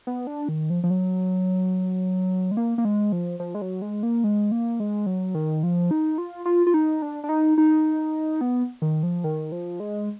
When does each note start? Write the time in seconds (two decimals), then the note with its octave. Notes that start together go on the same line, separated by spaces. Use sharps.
0.07 B3
0.27 D4
0.49 D#3
0.70 F3
0.84 F3
0.90 F#3
2.51 G#3
2.57 A#3
2.78 A#3
2.85 G#3
3.12 F3
3.40 F3
3.55 G#3
3.62 F#3
3.82 G#3
4.03 A#3
4.24 G#3
4.52 A#3
4.80 G#3
5.06 F#3
5.35 D#3
5.63 F3
5.91 D#4
6.18 F4
6.45 F4
6.67 F4
6.74 D#4
7.02 D4
7.24 D4
7.29 D#4
7.58 D#4
8.41 B3
8.82 D#3
9.03 F3
9.24 D#3
9.52 F3
9.80 G#3